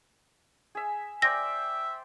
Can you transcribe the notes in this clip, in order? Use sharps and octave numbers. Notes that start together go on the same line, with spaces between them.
G#4 E5
C5 D5 E5 G5 A#6